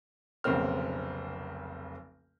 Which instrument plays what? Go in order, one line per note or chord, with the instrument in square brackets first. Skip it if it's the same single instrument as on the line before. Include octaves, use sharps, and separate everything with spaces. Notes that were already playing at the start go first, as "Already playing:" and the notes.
[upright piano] F1 B1 C#3 A#3 C4 F6